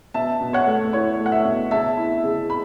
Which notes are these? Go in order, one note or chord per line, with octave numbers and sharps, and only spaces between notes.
B2 E5 A5
B2
C#5 F#5
A3
E4 C#5
A3
F#5
E5
B2
C#3 E5 A5
E4
C#3
B5